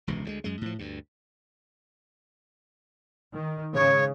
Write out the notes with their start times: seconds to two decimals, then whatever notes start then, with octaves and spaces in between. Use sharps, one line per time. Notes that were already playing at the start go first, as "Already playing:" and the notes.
0.07 E1 C#2 C3 E3
0.25 D2 F3 G#3
0.44 F#2 G#3
0.61 A2 F3
0.79 D2 G2
3.34 D#3
3.74 G#2 C#3 C#5